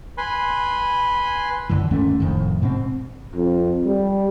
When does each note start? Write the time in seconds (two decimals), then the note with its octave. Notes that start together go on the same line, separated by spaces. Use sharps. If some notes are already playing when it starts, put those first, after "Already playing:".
0.18 B4 G#5 B5 C6
1.69 F#2 D3 E3
1.91 D#2 G#2 A3 C#4
2.20 F1 F2 A2 D#3
2.62 G#2 B2 B3 C4
3.35 F2
3.85 G3